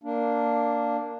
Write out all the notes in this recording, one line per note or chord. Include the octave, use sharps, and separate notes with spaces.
A#3 D4